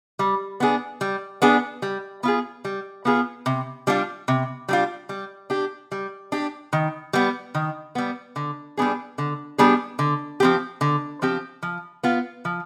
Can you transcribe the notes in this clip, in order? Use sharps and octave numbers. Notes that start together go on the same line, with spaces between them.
G3
B3 D4 G#4
G3
B3 D4 G#4
G3
B3 F4 G#4
G3
B3 F4 G#4
C3
G3 D4 F4
C3
G3 D4 F4
G3
D4 G4
G3
D4 G4
D#3
G3 B3
D#3
G3 B3
D3
G3 B3 D4 G#4
D3
G3 B3 D4 G#4
D3
F3 C4 G4
D3
F3 C4 G4
F3
B3 F4
F3